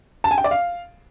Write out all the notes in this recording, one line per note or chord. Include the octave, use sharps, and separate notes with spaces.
A5
G#5
G5
D5
F5